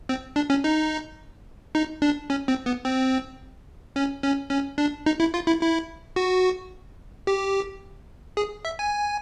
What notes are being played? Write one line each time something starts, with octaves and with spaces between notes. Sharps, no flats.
C4
D4
C#4
D#4
D#4
D4
C#4
C4
B3
C4
C#4
C#4
C#4
D4
D#4
E4
F4
E4
E4
F#4
G4
G#4
E5
G#5